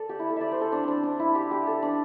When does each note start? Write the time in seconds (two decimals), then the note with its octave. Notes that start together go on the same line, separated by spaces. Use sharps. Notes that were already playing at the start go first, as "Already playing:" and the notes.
Already playing: A4 D5
0.09 G4
0.20 E4
0.30 A4
0.36 D5 E5
0.52 C5
0.61 A4
0.72 D4
0.83 C4 D4
1.03 D4
1.19 E4
1.35 G4
1.51 G4
1.67 A4
1.82 D4